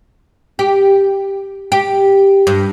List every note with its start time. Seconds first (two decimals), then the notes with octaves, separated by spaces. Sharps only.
0.59 G4
1.72 G4
2.47 G2